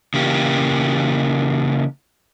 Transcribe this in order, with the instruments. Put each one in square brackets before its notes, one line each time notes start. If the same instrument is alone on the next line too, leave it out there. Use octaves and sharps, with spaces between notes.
[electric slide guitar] C#3 E3 A#3 G4